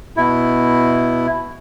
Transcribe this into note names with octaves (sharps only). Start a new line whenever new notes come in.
B2 E4